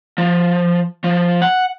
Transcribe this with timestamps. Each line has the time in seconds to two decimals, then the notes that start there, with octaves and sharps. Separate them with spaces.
0.18 F3
1.04 F3
1.42 F#5